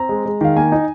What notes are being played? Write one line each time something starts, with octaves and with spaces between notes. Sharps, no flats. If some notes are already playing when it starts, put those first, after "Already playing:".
Already playing: C4 A#5
G#3
G#3
D#3 F5
A#3 G#5
D#4